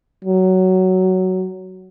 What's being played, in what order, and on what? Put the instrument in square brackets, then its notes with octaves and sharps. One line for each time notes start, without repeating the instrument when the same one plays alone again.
[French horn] F#3